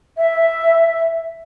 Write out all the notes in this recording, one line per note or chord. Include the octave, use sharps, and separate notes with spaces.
E5